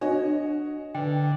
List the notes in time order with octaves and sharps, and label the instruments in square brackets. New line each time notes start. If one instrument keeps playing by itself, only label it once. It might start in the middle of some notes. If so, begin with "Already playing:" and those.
[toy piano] D4 [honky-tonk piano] F#4 C#5 D#5
[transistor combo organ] D3 [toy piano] B4 G5